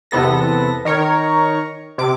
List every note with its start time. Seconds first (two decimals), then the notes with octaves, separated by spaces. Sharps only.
0.11 E2 C3 B3 A4 A#6
0.85 D#3 A#4 C#5
1.98 C3 D6